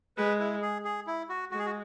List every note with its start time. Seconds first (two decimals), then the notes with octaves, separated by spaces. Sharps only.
0.17 G#3 B4
0.40 E4
0.62 G#4
0.85 G#4
1.07 E4
1.29 F#4
1.51 G#3 F#4
1.59 G#4
1.66 F#4